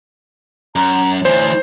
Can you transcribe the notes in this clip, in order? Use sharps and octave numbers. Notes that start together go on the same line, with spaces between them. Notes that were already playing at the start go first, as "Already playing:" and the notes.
F#2 A#5
D2 E3 C5 C#5